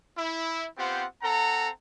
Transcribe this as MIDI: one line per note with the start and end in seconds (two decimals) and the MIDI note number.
0.17 0.66 64
0.78 1.05 59
0.78 1.05 60
0.78 1.05 65
0.78 1.05 67
0.78 1.05 72
0.78 1.05 78
1.22 1.69 60
1.22 1.69 69
1.22 1.69 78
1.22 1.69 82